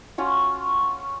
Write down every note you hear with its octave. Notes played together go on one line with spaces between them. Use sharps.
C#4 F4 F#4